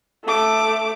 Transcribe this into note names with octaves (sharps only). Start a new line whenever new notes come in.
A3 D6